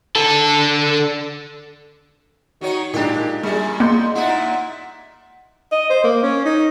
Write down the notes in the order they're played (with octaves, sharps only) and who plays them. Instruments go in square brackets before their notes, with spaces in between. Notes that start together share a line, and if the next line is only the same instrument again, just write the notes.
[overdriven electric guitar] D3 A4
[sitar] D#3 D#4 C#5 [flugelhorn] F#4
[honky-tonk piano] A#2 G#3 [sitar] D4 G4 [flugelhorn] D#4
[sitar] A#2 G#3 [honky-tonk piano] G3 [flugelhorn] G#4
[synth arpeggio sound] A#3 [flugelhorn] D#5 [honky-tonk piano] C6 G6 C#7
[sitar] A#2 D#4 E4 [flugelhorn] F#5
[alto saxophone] D#5
C5
A#3
C#4
D#4